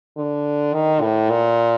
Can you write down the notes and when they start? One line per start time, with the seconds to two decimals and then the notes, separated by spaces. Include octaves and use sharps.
0.17 D3
0.73 D#3
1.01 A2
1.30 A#2